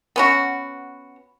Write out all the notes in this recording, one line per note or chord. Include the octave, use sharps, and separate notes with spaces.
B3 C#4 F#4